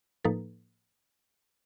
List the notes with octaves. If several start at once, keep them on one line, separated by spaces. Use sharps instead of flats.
A2 F3 A#3 D#4 A4 B4